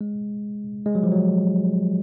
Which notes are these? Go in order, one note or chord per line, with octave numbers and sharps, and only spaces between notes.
G#3
G#3
F#3
F3
F#3